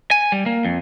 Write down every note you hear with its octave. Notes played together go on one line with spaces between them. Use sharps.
G#5
G3
A#3
F2